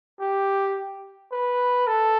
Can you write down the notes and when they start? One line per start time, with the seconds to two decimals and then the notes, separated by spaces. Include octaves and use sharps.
0.20 G4
1.32 B4
1.87 A4